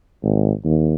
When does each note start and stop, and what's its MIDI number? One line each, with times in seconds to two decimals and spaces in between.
0.23 0.52 32
0.65 0.95 39